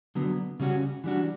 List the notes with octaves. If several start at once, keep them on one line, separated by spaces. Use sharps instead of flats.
D3 F#3 B3
C#3 G3 C#4 F#4
E3 G3 B3 D4 F#4